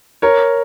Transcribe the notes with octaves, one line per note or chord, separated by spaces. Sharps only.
A#4 C#5